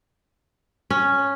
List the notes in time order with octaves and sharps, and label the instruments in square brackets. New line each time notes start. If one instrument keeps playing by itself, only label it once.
[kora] C#4